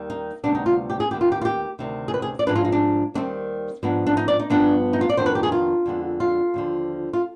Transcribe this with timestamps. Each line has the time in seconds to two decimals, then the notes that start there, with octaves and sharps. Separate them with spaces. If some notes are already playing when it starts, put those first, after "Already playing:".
Already playing: D#2 D#3 G3
0.10 D#4
0.43 D2 C3 G3 B3 D4
0.55 D#4
0.66 F4
0.90 G4
1.00 G#4
1.11 D#2 D#3 B3 G4
1.21 F4
1.32 G4
1.41 F4
1.45 G4
1.79 D2 C3 D#3
2.08 G#4
2.14 B4
2.22 G#4
2.39 D5
2.46 G#2 F3 G#3 D4 B4
2.56 F4
2.65 D#4
2.72 D4
3.14 D#2 D#3 G3 C4 D4
3.83 G#2 F3 B3 D4
4.07 D4
4.17 D#4
4.28 D5
4.40 D#4
4.50 G2 F3 B3 D4
4.93 D#4
5.01 F4
5.09 D5
5.17 F2 D#3 B3 D4 C5
5.26 B4
5.35 G4
5.43 G#4
5.52 F4
5.86 F2 D3 G#3 B3
6.20 F4
6.54 D#2 D3 F3
7.13 F4